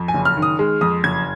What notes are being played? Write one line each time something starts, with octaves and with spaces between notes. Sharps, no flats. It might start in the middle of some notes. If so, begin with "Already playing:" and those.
Already playing: F2
G#5
F#1
F6
D#3
D#6
G#3
F2 D#6
F#1 G#6